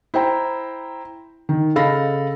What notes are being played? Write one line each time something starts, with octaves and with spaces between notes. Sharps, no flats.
E4 C5 G5 A#5
D#3
C#3 A4 D#5 F5 B5 A#6